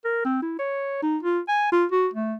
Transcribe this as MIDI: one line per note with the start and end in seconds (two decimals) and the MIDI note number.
0.05 0.22 70
0.25 0.40 60
0.42 0.55 64
0.59 1.00 73
1.03 1.18 63
1.23 1.40 65
1.48 1.72 80
1.72 1.85 65
1.91 2.08 66
2.14 2.35 57